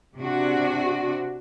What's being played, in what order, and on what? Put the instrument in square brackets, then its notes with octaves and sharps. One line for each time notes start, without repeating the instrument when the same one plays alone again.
[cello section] C3 D4 F#4